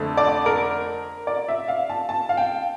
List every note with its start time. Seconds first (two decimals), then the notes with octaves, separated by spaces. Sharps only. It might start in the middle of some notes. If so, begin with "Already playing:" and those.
Already playing: F2 D3 A3 D4
0.17 D5
0.46 A#4
1.27 D5
1.48 E5
1.68 F5
1.90 A5
2.09 A5
2.29 F5
2.37 G5